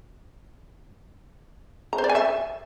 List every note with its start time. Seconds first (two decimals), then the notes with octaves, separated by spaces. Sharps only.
1.93 A#5
1.98 C5
2.04 D5
2.09 G#5
2.15 E5